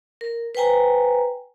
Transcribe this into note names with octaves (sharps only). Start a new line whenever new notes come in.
A#4
B4 C5 G5 G#5 A#5